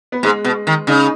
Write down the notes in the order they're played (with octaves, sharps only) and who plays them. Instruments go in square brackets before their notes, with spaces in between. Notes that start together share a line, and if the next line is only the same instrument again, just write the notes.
[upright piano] B3
[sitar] G#2 [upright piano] G#3
[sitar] B2
D#3
[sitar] C#3 [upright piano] D#4